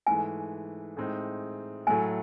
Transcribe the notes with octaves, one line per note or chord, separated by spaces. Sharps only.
G#2 E3 A3 G#5
A2 G#3 C4 D#4
A2 F#3 A3 G#5